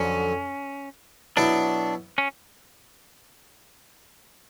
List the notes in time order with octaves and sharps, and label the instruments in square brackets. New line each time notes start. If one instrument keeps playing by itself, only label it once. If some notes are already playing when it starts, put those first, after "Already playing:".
Already playing: [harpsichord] F2 D3 F#3 [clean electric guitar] C#4
[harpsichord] B2 F#3 B3 E4 [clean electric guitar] D4
[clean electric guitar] C#4